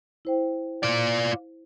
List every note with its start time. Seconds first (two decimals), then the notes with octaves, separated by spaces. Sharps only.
0.25 E4 C5 G5
0.83 F4 D5